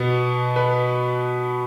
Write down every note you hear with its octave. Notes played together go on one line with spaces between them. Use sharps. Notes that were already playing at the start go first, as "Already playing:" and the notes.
Already playing: B2 B3
B4